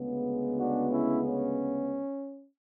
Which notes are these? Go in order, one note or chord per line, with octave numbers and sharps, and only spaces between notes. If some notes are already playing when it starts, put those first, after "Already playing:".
Already playing: D2 C#3 G#3 B3
D4 F#4
C#4 E4
C#4